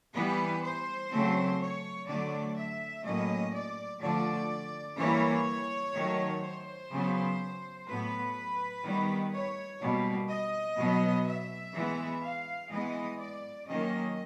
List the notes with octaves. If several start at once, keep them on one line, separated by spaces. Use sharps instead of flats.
E3 G3 B3 B4
C5
C#3 F#3 A3 C4
C#5
D3 F#3 A3 D5
E5
A2 F#3 A#3 C#4 D#5
D5
D3 F3 A3 D5
E3 G3 A#3 C#5
D#3 F#3 A3
C5
C#3 F#3 B3
A2 F#3 B3 B4
D#3 G3 B3
C#5
B2 G3 A#3
D#5
B2 F#3 B3
E5
E3 G#3 B3
F5
E3 G#3 B3 D#5
D5
D#3 F#3 A#3 C#4 D#5